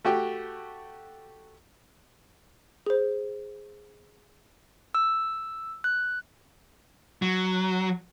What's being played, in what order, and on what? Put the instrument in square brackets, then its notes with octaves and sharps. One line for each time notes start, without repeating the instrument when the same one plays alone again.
[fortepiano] A3 F#4 G4 G5
[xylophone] G#4 C5
[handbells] E6
F#6
[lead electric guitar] F#3